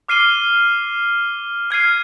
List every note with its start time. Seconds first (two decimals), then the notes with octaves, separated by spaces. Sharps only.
0.09 D6 F6 C7 D#7 G7
1.71 F6 G#6 C7 D#7